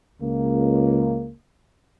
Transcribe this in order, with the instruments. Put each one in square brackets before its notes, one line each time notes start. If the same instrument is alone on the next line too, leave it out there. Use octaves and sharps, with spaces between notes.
[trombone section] C#2 A#3